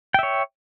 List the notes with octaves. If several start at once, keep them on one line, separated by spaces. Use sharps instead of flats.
C#5 E5 G5